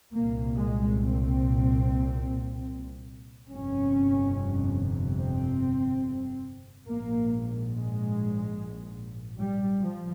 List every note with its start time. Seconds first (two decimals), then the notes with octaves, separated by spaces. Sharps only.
0.13 C2 A#2 A#3
0.55 G#3
0.97 C4
3.50 G1 F2 C3 C#4
5.19 C4
6.86 A#1 G#2 A#3
7.71 G#3
9.39 G3
9.81 F3